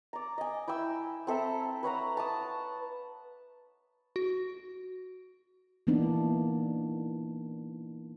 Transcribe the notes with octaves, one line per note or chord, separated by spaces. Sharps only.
D5 A#5
D#5 G#5
E4 G5 G#5 E6
C4 A4 E5 A#5
B4 C#5 F#5 A#5
A5 D#6
F#4
E3 A#3 B3 D4 D#4